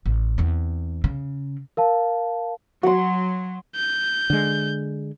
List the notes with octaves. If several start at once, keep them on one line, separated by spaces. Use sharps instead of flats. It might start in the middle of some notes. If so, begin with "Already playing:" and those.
A1
E2 C4
C#3
A#4 F5 A5
F#3 F#4 F#5 C6
G6
D3 G#3